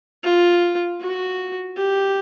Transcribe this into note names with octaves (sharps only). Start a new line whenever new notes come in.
F4
F#4
G4